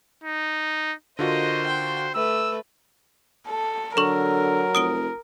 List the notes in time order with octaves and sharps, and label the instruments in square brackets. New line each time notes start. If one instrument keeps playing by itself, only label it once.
[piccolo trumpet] D#4
[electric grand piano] D3 F4 F#4 [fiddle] A#4 D#5 [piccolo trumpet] C5
[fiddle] G5
[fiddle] A3 B4 [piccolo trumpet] E6
[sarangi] A4
[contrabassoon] D3 [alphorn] F#3 [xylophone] A4 C#6 [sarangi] A#4
[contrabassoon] F1 [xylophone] D#6 D7 G7